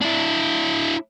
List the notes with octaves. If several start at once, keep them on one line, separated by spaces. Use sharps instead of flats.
D4 E4